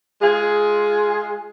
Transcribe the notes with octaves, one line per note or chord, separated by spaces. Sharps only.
G#3 F4 G#4